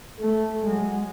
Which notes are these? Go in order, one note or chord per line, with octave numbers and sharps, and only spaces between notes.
A3
F#3 G#3